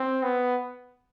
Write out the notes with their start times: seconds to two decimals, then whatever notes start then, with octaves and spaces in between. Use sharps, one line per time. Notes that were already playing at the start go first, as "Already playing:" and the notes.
Already playing: C4
0.23 B3